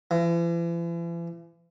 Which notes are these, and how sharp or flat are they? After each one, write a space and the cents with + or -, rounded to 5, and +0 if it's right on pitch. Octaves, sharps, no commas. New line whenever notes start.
E3 +40